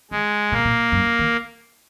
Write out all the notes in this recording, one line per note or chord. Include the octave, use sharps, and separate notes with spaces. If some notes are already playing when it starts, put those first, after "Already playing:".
D#3 G#3
B2 A#3
A#2
F#2
D#3